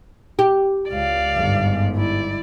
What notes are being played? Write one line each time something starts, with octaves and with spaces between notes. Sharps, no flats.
G4
C#2 D5 F5
G1 G#2
E4 D5